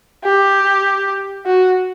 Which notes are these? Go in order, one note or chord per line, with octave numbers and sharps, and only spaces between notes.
G4
F#4